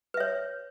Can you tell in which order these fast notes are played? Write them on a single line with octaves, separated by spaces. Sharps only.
B4 E5 C#5